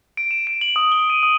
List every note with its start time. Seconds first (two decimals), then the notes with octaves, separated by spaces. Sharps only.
0.17 D7
0.31 E7
0.47 D7
0.61 F#7
0.76 D#6
0.92 G7
1.10 D#7
1.23 D#6